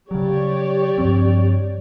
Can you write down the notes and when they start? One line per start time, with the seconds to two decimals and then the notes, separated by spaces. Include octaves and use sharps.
0.11 C#3 F#3 G4 C#5 D5
0.98 G2 F3 C4